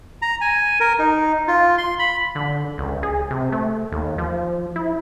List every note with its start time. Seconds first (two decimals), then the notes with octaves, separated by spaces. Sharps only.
0.22 A#5
0.41 G#5
0.80 A#4
0.99 D#4
1.48 F4
1.78 C6
1.99 B5
2.35 D3
2.78 C#2
3.03 G#4
3.31 C3
3.52 A3
3.92 D#2
4.18 F3
4.76 E4